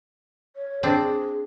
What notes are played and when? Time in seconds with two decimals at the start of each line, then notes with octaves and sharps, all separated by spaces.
0.56 C#5
0.83 C4 D4 G#4